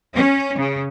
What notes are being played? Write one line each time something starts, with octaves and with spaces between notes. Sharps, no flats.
C#4
C#3